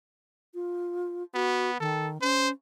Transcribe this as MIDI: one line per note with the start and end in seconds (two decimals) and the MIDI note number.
0.54 1.23 65
1.34 1.80 59
1.34 1.71 66
1.80 2.21 51
1.80 2.09 69
2.21 2.52 61
2.21 2.49 72